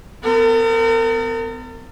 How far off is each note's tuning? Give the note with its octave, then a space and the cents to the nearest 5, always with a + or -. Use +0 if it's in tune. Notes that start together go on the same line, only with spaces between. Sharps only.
B3 +40 A#4 -40